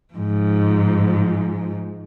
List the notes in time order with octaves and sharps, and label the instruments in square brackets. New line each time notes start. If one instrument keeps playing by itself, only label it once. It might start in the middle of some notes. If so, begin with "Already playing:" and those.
[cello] G#2 F3